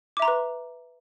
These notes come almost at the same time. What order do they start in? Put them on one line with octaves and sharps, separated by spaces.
D6 E5 A#5 C6 B4